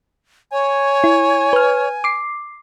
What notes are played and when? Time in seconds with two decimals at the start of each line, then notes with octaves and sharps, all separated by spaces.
0.52 C#5 G#5
1.04 E4
1.53 B4 F6
2.04 D6 C7